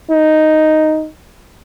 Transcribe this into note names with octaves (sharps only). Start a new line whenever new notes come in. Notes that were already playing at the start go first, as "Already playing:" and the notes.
D#4